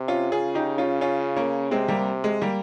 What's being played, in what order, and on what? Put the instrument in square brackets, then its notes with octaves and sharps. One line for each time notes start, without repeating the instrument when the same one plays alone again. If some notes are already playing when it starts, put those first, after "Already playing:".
Already playing: [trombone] C3
[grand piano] C#4 F4
[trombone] C#3 [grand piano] F4 G#4
[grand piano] D#4 G4
C#4 F4
C#4 F4
A#3 C#4
[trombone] C3 [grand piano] G#3 C4
[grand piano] G3 A#3
G#3
G3 A#3